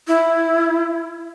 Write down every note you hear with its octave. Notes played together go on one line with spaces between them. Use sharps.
E4